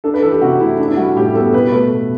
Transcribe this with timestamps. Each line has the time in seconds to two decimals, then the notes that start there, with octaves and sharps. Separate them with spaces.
0.04 D4 A4
0.14 B4
0.22 E3 A4
0.31 G4
0.41 C3 F#4
0.60 A3 E4
0.78 D4
0.88 E4
0.97 G3 F#4
1.15 A2 G4
1.35 B3 A4
1.54 B2 B4
1.72 A3 B4
1.92 B2